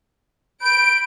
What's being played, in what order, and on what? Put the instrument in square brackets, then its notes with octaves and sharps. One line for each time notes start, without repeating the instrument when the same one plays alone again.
[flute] B5 [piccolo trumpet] G6 [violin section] D7